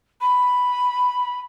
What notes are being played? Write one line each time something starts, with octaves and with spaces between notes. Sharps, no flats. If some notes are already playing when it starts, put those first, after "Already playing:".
B5